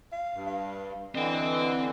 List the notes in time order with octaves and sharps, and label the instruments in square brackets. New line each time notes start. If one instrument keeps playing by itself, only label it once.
[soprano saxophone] F5
[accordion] G2
[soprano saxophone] F5
[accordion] D3 E3 [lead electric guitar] C4 G5 [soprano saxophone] D#5